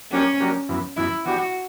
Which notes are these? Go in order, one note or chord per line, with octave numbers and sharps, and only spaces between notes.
F#3 A#3 C#4 D4 G4 A#4
F#3 A#3 D4 G4 A#4
F#2 E3 B3
F#2 E3 B3 E4
E3 B3 D4 F#4 G4